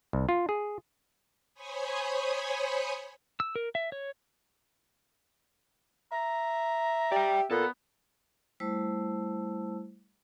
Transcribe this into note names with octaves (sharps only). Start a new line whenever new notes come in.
C2
F4
G#4
C5 C#5 G#5 B5 C#6 D#6
E6
A#4
E5
C#5
E5 A#5
G4 D5 G5
A#2 B3 A4
G3 A3 E4 C5 A5 E6